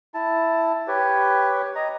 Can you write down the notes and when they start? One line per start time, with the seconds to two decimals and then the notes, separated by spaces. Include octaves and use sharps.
0.14 E4 A5
0.88 G4 B4 C#5
1.75 D#5 A#5